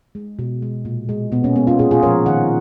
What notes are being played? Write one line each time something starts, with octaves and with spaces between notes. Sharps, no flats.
G#3
B2
G#3
A#2
G#3
B2 B3
A#3 C#4
G#3 B3
C#4 F4
A#2 F4 G#4
F4 G#4
F3 G#3 A#4 C#5
D#3 D#5 F#5